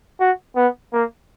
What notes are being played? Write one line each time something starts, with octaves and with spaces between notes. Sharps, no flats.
F#4
B3
A#3